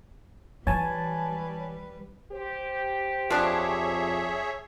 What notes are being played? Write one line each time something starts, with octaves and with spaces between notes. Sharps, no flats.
E3 G3 B4 C#5 G#5 A5
G4 C5
F2 F3 D4 G#4 C#5 E5